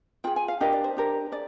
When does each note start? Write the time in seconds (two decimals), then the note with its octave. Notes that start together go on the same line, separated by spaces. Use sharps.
0.24 F4 G#4 G5
0.36 G#5
0.48 F5
0.60 D4 G4 A#4 D#5
0.73 D5
0.84 C5
0.97 D4 G4 A#4
1.32 G#4 D5